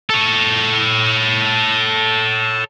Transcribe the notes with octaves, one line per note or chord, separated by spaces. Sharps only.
A4 C#5